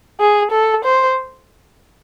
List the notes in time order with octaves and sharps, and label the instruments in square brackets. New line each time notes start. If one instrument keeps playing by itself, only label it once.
[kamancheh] G#4
A4
C5